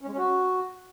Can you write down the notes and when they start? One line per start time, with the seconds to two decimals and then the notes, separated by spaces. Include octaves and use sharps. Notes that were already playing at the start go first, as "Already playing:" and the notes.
0.01 C#4
0.07 G#3
0.12 C#4
0.18 F#4